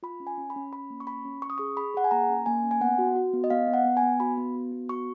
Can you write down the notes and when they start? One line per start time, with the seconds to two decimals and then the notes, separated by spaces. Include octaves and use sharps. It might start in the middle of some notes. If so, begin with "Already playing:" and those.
0.03 F4 B5
0.20 C#4
0.27 G#5
0.38 C#4
0.50 B5
0.56 C#4
0.73 C#4 B5
0.90 A#3
1.00 C#6
1.07 C#4 B5
1.25 C#4
1.42 C#4 C#6
1.50 D#6
1.58 G#4 C#6
1.77 G#4 B5
1.94 G#4 F#5
2.04 G#5
2.11 A#3 A#5
2.29 C#4
2.46 A#3 G#5
2.64 C#4
2.71 G#5
2.81 B3 F#5
2.98 F#4
3.15 F#4
3.33 B3
3.44 D#5
3.50 B3 F5
3.68 B3
3.73 F#5
3.85 B3
3.97 G#5
4.03 B3
4.20 F#4 B5
4.37 B3
4.55 F#4
4.72 B3
4.89 F#4 C#6